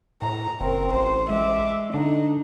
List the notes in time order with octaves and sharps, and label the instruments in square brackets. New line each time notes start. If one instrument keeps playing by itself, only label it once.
[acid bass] A2 [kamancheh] A#5
[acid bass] F#1 [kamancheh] C4 A#4
[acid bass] A1 [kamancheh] C5
[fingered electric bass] G#3 [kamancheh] E5 D6
[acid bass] D3 [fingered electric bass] D4 [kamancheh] D#4